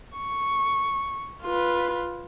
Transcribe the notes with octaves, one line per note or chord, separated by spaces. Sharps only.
C#6
F4 B4